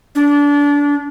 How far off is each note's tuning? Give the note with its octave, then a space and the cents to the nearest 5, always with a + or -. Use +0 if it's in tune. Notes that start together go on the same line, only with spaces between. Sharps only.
D4 -25